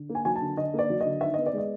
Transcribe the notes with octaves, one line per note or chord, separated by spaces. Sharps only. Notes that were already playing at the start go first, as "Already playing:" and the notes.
Already playing: D3
A#3
G#5
F#3 G#5
A5
D3
D3 D#5
A#3 D5
F#3
D3 D#5
D#3 E5
B3 D#5
D5
G#3 D#5